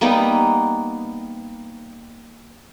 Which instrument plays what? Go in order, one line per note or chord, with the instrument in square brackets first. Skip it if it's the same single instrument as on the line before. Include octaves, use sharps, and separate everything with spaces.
[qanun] G3 A#3 B3 D#4